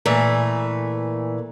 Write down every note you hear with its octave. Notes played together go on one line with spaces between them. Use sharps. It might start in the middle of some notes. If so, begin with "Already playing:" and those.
A#2 E3 A3 B4